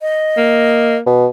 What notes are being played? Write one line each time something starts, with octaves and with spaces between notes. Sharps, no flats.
D#5
A#3
B2